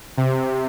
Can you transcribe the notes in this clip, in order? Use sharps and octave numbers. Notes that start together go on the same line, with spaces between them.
C3